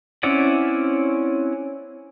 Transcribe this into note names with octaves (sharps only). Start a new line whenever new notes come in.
C4 C#4 E4 D5 F#5